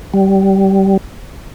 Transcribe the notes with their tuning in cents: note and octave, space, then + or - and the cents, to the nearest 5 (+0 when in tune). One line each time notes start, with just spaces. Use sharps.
G3 -20